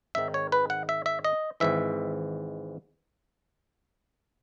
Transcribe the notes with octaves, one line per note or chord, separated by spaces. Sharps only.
G#1 G#2 D#3 E5
C#5
B4
F#5
E5
E5
D#5
G#1 G#2 E3 E5